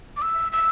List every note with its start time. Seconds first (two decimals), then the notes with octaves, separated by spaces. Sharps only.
0.17 D6
0.22 E6
0.52 E6